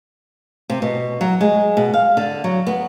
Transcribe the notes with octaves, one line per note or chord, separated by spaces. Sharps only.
C3
B2
F#3
G#3
B2
F5
D3
F#3
B3